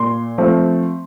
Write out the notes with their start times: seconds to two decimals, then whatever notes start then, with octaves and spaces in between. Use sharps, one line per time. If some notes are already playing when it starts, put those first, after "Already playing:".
Already playing: A#2 C6
0.38 F3 A3 C4